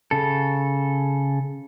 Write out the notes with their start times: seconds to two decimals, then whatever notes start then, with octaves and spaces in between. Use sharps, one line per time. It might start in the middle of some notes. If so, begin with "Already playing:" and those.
0.11 C#3 A4